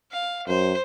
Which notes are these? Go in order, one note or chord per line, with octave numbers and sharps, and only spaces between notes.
F5
F#2 C5